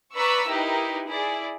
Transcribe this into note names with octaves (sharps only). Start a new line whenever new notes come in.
B4 D5 A#5 B5 C#6 E6
D#4 E4 G4 A#4 B4
E4 G#4 D5